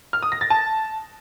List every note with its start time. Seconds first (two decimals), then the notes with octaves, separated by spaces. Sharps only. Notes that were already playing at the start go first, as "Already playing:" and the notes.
0.13 F6
0.23 D#6
0.32 A#6
0.41 A6
0.50 A5